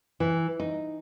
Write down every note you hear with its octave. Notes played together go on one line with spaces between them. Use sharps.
E3
D#4